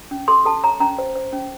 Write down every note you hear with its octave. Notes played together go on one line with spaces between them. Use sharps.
C#4
A4 C6
A4 A5
C#5 A#5
C#4 A#5
C5
C5
C#4